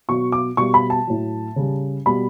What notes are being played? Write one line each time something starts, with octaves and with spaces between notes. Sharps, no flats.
B2 F#3 C#6
D6
B2 G3 C#6
B5
A5
A2 F#3
C#3 G3
B2 G3 B5